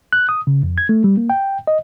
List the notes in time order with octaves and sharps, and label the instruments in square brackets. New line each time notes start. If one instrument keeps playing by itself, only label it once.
[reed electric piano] F#6
D#6
C#3
F2
G#6
A3
G3
A#3
G5
D#5